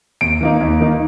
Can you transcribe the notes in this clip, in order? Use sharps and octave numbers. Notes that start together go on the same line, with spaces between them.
D#2 D7
D#3 A#3 D#4
D#2
D#3 A#3 D#4